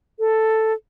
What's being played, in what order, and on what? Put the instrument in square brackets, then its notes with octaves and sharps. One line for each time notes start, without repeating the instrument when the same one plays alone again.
[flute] A4